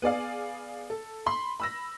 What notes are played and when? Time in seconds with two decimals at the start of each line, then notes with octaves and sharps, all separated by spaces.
0.02 B3 G#4 D5 F5
0.90 A4
1.26 B5 C6
1.60 B5 E6 A#6